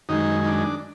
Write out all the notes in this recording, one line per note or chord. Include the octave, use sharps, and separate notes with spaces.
F#2 D#3 G#3 D#4
D#4
D4